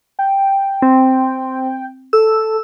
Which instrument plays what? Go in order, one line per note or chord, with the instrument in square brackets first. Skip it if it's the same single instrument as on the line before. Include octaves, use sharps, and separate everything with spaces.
[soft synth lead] G5
[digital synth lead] C4
[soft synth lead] A4 [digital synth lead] E6